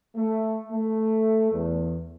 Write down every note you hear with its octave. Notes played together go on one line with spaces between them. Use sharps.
A3
A3
E2